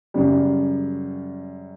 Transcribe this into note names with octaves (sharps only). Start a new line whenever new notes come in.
F#2 C#3 G3